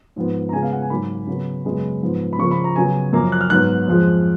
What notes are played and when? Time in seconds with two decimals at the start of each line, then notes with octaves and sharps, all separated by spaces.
0.16 G#2 F3 B3
0.49 A#5
0.53 C#3 G#3 B3 G#5
0.63 F5
0.73 F#5
0.82 G#5
0.90 G#2 F#3 A#3 B5
1.27 C#3 F#3 B3
1.65 F#2 C#3 G#3 B3
2.02 G#2 F3 B3
2.33 B5
2.39 C#3 F3 A#3 C#6
2.51 B5
2.64 A#5
2.76 C#3 F#3 B3 G#5
3.13 F#2 F3 A#3 A#5
3.32 F#6
3.41 F6
3.50 G#2 D#3 F#3 B3 F#6
3.88 F2 F3 G#3